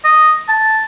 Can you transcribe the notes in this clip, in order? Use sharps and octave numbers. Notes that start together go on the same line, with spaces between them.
D#5
A5